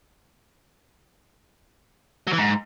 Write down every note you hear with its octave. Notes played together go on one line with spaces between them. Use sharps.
F#3
E3
G#2